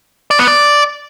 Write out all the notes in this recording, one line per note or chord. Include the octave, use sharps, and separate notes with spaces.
D5
B3
D5